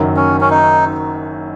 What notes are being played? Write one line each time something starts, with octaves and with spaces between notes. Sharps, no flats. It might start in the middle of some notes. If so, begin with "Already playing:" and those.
Already playing: F#1 F#2 D#3 F#3 A#3
C#4
C#4
D#4